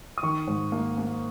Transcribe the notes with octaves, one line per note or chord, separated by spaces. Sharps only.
D#6
D#3 C#6
G#2
A#3
A#3